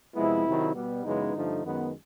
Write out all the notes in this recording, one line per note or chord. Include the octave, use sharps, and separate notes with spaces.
F2 C3 F3 G#3 B3 E4
C3 D#3 F#3
B2 G3 B3
F#2 C#3 E3 G#3 B3 D#4
G2 D3 F3 A3
F#2 D#3 G#3 B3